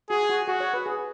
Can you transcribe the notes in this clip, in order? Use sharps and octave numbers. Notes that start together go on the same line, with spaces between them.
F#4 G#4
F#4
F#4 G#4
C#5
B4
G#4